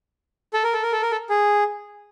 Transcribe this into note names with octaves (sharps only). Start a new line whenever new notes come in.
A4
A#4
A4
A#4
A4
A#4
A4
G#4